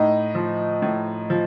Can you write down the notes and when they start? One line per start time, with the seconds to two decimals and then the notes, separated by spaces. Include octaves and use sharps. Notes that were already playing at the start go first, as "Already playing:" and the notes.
Already playing: A2 D#4
0.35 F3
0.82 A2
1.30 F3